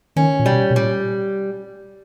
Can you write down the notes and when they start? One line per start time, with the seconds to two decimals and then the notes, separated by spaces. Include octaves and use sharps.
0.16 D#3 C#4
0.39 A#2
0.46 B2 G3
0.70 B2
0.76 A#2 G3